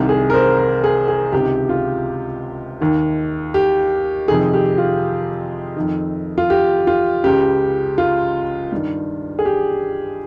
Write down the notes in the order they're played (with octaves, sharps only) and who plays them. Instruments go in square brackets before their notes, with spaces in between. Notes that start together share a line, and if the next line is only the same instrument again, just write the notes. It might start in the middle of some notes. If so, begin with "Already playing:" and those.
Already playing: [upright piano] C2 C3 D#3
G#4
A#4
C5
A#4
G#4
G#4
C#2 C3 D#3 G4
F4
D#2 D#3
G4
F2 C3 D#3 G#4
G4
F4
F2 D#3
F4
G4
F4
C#2 C#3 G4
F4
G2 D#3
G#4
G4